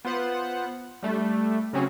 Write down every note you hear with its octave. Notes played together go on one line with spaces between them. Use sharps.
B3 F4 C5 F#5
G3 A3 D4
C#3 F#3 C4 C#4 F#4 G#4